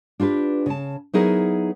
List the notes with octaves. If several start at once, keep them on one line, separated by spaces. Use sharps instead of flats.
D4 F4 G4 B4
C#3 A5
F#3 B3 D#4 E4 G#4 A#4